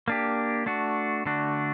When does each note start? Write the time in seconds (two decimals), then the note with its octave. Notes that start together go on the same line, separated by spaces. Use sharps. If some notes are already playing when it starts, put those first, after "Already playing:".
0.08 A#3 D4 G4
0.66 A3 D4 F#4
1.25 D3 A3 D4 F#4